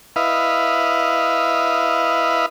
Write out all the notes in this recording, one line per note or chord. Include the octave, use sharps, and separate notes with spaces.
E4 B4 D#5 F5